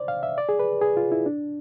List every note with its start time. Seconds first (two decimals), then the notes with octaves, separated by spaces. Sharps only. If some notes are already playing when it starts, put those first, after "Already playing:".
Already playing: C5 D5
0.08 F5
0.23 E5
0.38 D5
0.49 G#4
0.59 B4
0.82 G#4
0.97 F4
1.12 E4
1.26 D4